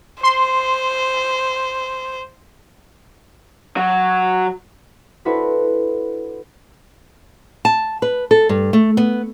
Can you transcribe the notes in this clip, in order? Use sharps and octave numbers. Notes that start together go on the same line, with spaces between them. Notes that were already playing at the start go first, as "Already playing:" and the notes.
C5 C6
F#3 F#4
D4 E4 F#4 A4 B4 C5
A5
B4
A4
G2
A3
B3